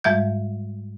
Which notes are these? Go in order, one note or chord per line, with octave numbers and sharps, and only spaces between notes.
G#2 G3 G#3 E5 G6